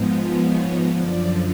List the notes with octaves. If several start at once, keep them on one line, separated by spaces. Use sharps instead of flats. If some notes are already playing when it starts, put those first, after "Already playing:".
Already playing: G#2 F3 G#3 B3
C#5
F#2 D3 F3 D5